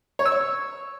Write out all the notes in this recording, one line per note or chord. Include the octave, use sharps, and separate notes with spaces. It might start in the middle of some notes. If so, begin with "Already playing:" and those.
C#5
E6
C#5